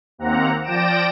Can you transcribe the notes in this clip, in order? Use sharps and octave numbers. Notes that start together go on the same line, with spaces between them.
D#2 A#3 C4 F#5 A#5
F3 D5 G5 A#6 D7 E7